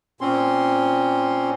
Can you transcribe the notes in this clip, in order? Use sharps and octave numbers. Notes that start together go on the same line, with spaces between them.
A#2 C4 C#4 C6